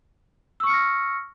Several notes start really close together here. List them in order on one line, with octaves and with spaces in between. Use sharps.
E6 C#6 C#7 F6 A#6